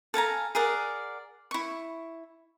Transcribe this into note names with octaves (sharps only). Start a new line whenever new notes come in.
A4 F5 G#5 A#5
G#4 A#4 D5 F#5
E4 C#6